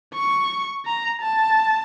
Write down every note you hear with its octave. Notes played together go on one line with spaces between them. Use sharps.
C#6
A#5
A5